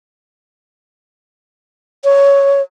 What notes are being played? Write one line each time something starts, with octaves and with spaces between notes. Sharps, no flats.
C#5